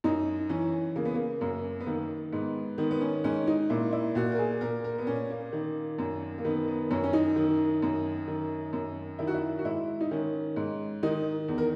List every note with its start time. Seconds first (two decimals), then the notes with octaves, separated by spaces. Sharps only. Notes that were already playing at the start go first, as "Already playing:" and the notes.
0.04 F#2 D#4
0.49 E3 C#4
0.96 C#3 A#3
1.05 B3
1.14 A#3
1.41 F#2 A#3
1.80 B3
1.86 D#3 A#3
2.32 G#2 B3
2.78 D#3 B3
2.91 B3
3.01 C#4
3.24 G#2 C#4
3.47 D#4
3.70 A#2 E4
3.93 E4
4.15 A#2 F#4
4.32 A#4
4.38 G#4
4.61 A#2 A#4
4.84 A#4
4.98 B3
5.07 A#2 C#4
5.30 A#3
5.53 D#3
5.99 F#2
6.38 A#3
6.45 D#3 B3
6.68 B3
6.90 F#2 C#4
7.04 C#4
7.13 D#4
7.36 D#3
7.82 F#2
8.28 D#3
8.73 F#2
9.19 D#3 E4
9.27 F#4
9.34 E4
9.58 F#4
9.65 G#2 E4
10.01 D#4
10.11 D#3 C#4
10.56 G#2
11.03 D#3 D#4
11.48 E2
11.58 A#4